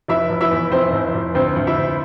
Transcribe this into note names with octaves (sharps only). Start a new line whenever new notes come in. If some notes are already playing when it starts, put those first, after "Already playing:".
F1 E4 E5
F1
E4 E5
E2
F1 C4 C5
F1
F1
D2 C4 C5
D2
E4 E5
D2